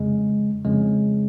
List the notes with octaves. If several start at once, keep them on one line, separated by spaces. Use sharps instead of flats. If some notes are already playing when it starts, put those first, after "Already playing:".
Already playing: F2 C#3 G#3
F2 C#3 G#3